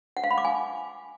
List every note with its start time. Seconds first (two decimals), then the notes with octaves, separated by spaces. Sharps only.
0.17 F#5
0.24 F5
0.31 B5
0.38 D6
0.45 G#5